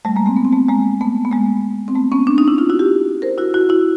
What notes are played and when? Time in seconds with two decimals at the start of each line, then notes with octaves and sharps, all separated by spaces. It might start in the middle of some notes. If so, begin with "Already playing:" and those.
0.05 G3 A3
0.16 G#3 A#3
0.26 A#3 C4
0.37 B3
0.45 C4
0.53 A3 B3
0.68 G#3 A#3
1.01 A3 B3
1.25 B3
1.32 G#3 A#3
1.88 C4
1.95 A3 B3
2.12 B3 C#4
2.27 C4 D4
2.38 C#4 D#4
2.48 D4 E4
2.58 D#4 F4
2.69 E4 F#4
2.79 F4 G4
3.22 A#4 C5
3.38 E4 F#4
3.54 E4 F#4
3.69 E4 F#4